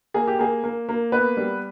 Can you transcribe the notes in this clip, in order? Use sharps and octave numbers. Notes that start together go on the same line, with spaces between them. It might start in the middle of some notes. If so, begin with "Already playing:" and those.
A#3 G#4
G4
A#3 G#4
A#3
A#3
B3 B4
G3